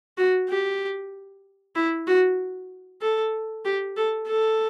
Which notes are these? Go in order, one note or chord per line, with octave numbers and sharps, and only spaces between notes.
F#4
G4
E4
F#4
A4
G4
A4
A4